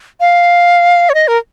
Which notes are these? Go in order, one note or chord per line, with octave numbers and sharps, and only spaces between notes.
F5
C#5
D#5
A#4